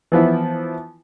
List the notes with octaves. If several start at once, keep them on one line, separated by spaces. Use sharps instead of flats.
E3 F3 B3 E4